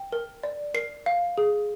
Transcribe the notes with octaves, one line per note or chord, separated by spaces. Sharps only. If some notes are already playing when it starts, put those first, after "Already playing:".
Already playing: G5
A#4
D5
A#4 C7
F5
G#4